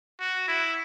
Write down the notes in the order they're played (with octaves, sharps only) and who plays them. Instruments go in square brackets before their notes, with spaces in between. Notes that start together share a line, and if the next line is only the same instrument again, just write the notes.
[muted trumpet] F#4
E4